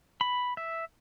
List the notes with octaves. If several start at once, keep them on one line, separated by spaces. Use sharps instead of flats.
B5
E5